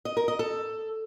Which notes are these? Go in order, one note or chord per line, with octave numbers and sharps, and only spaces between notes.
D#5
A#4
D#5
A4